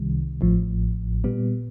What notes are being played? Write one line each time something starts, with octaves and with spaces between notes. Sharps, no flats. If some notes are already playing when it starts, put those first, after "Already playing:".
Already playing: C2 C3 D#3 G3
A1 A2 F3
A#2 G3 B3